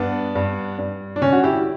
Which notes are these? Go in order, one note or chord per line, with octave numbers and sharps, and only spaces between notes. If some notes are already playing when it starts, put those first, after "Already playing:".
Already playing: G2 B3 D4
G2
G2
D4
D3 C#4
F#4
E4 G4